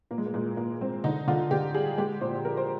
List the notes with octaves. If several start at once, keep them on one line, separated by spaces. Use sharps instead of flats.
A#2 A#3
G#3
A#3
A#2 G#3
A#2 A#3
G#3 C4
D3 D#4
D3 F4
D3 G4
G3 G#4
G#3 G4
A#2 C5
F3 A#4
C5